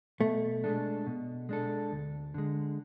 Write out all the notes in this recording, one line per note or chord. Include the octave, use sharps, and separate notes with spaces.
B2 A3
G#3 D4 A4
B2
G#3 D4 A4
D2
D3 G#3